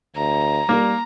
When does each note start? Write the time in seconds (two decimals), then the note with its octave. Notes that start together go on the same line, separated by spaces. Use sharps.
0.16 D2 A#5
0.69 G3 A#3